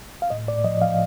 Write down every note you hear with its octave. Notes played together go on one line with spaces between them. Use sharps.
F5
A2 D#5
A2 D5
F3 D#5
F3 F5